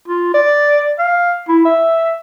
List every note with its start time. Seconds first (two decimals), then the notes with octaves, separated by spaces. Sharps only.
0.08 F4
0.34 D5
0.99 F5
1.49 E4
1.65 E5